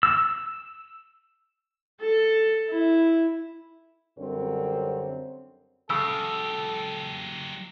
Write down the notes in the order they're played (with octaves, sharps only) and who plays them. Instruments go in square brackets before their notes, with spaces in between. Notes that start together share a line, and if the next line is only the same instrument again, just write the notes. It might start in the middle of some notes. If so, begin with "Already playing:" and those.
[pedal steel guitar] E6
[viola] A4
E4
[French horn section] F#2 D3 G3 C4 A#4 C#5
[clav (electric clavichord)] C#3 [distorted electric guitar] F#3 G4 [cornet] A4 [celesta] E6